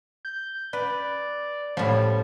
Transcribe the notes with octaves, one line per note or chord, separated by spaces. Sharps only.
G6
B4 D5
A2 F3 G3